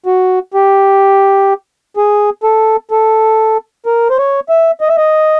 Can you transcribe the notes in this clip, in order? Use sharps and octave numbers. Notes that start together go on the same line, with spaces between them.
F#4
G4
G#4
A4
A4
A#4
C5
C#5
E5
D#5
E5
D#5